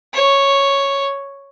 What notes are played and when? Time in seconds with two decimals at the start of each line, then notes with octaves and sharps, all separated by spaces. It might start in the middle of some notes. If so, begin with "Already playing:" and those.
0.14 C#5